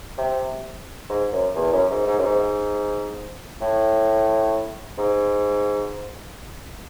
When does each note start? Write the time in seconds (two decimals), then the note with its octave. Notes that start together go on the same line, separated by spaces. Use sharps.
0.18 C3
1.09 G#2
1.32 F#2
1.56 E2
1.73 F#2
1.90 G#2
2.07 G#2
2.19 F#2
2.24 G#2
3.61 A2
4.98 G#2